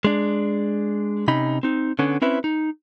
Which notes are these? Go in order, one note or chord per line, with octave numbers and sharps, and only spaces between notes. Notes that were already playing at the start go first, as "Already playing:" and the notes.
G#3 D4
C3 C#4 D#4 B5
C4 D#4
D3 B3 C#4
C4 C#4 E4 B4
D#4